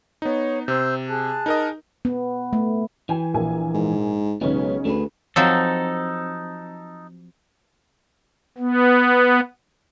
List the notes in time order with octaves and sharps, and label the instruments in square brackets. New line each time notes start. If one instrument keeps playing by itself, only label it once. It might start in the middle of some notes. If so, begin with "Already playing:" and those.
[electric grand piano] B3 D#4 [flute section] C#5
[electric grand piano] C3 [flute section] C5 E6 G6
[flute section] G#4 A5 F#6
[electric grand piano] D#4 A#4 D#5
[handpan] B3
A3
[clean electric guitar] E3 [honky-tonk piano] G5 G#5
[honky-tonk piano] A#1 A#3 G#5
[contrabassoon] G#2
[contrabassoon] B1 [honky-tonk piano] C#3 C#4 D#4 [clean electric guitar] G#3 B3
[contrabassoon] D2 [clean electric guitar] A3 G#4 B4
[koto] F3 F#3 C4 [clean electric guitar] D#4 A4
[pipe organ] B3